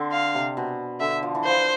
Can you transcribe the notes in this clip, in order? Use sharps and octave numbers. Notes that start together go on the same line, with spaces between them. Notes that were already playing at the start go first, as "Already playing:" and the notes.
Already playing: D3 C4
F5
C3
B2
D3 E5
F3
E3
F3 C5